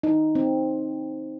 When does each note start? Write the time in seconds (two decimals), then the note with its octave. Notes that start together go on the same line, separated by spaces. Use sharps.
0.03 D#4
0.35 C4